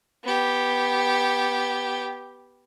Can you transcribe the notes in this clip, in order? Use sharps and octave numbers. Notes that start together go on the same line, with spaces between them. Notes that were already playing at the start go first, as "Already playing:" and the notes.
B3 G4